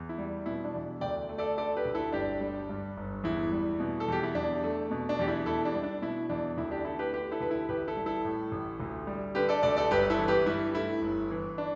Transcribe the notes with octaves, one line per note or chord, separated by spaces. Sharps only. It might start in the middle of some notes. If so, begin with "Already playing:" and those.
Already playing: E2
E4
G3
B2 E4
D4
E2
D2 D5 G5
A3
A4 D5
D3 A4 D5
G4 B4
D2
E4 A4
G1 D4 G4
G3
G2
G1
E2 E4
G3
B2
A4
E2 G4
E4
E2 D4
A3
B2
D4
E2 G4
E4
E2 E4 A4
D4
G3
D4
B2 E4
E2 D4
D2 E4
D4 G4
A3 E4 A4
G4 B4
D3 G4 B4
E4 A4
D2 B4
E4 A4
A1 G4 B4
E4 A4
G3
E4 A4
A2
A1
D2
G3
D3 G4 B4
A4 D5
D2 A4 D5
A4 D5
G1 G4 B4
E4 A4
E3
G4 B4
G2 E4
A3 E4
G1
E3
D4